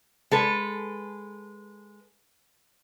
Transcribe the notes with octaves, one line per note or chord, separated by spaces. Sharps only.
G#3 A4 B4